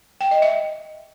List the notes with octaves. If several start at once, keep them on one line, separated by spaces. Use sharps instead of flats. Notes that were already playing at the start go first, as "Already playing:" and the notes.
G5
D#5
E5